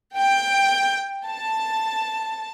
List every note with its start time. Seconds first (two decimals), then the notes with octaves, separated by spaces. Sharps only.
0.16 G5
1.26 A5